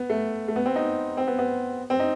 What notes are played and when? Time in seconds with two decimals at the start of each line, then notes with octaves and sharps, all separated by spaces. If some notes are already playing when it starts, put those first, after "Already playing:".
Already playing: B3
0.10 A3
0.48 A3
0.56 B3
0.66 C4
0.76 D#4
1.17 C4
1.27 B3
1.39 B3
1.90 C4
2.00 D#4